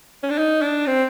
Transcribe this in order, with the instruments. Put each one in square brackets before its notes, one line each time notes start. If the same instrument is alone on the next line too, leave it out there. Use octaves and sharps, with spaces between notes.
[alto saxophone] C#4
D4
D#4
D4
C4